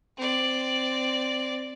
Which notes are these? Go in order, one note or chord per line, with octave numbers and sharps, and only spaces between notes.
C4 D5